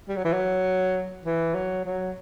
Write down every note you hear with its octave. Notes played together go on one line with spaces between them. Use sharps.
G3
F#3
E3
F#3
E3
F#3
F#3